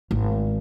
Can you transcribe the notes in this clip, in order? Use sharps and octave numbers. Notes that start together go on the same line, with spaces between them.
G#1